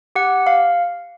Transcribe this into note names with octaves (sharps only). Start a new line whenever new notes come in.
G4 F#5
F5